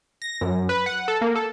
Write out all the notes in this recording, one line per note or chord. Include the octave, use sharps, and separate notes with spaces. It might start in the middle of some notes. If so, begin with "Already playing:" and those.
A#6
F#2
B4
F#5
A4
A#3
A4